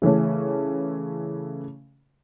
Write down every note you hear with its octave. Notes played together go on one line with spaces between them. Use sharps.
C#3 E3 A3 C#4